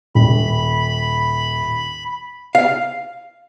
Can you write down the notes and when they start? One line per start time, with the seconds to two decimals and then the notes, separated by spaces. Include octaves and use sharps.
0.15 D#1 B5
2.55 F5